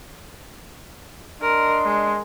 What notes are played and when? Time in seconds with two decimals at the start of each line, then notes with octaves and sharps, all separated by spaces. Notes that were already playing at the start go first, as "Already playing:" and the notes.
1.42 D4 A#4 D#5 C6
1.85 G#3